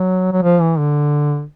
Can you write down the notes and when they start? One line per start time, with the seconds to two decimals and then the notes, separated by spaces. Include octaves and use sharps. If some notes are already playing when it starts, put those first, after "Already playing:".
Already playing: F#3
0.33 F#3
0.42 F3
0.60 E3
0.78 D3